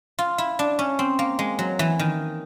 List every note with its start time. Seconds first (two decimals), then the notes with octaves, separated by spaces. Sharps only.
0.19 F4
0.38 E4
0.59 D4
0.79 C#4
0.99 C4
1.19 A#3
1.39 G#3
1.59 F#3
1.79 E3
1.99 D#3